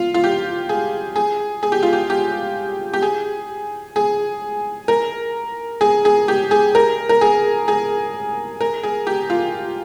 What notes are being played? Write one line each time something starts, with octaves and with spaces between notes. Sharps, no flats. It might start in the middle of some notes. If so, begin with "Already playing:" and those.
Already playing: F4
F4
G4
G#4
G#4
G#4
G4
F4
G4
G4
G4
G#4
G#4
A#4
G#4
G#4
G4
G#4
A#4
A#4
G#4
G#4
A#4
G#4
G4
F4